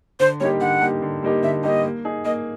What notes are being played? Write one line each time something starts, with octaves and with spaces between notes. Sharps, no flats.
D3 C5
G3 A#3 D#4 G4 C#5
D3 F#5
G3 A#3 D#4 G4
D3
G3 A#3 D#4 G4
D3 E5
G3 A#3 D#4 G4 D#5
A#3
D#4 G#4
A#3 D#5